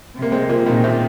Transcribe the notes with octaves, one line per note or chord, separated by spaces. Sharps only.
C3
A#3
G#3 C4
F3 A#3
A#2 D#3 G#3
C3 F3